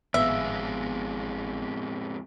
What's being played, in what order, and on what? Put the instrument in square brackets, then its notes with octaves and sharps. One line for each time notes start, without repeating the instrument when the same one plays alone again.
[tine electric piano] G#1 F5 [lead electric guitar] F2 G#3 [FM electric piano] A2 B3 [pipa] E5